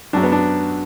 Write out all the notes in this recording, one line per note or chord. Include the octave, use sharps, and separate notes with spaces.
F#2 F#3 D4
B3
D4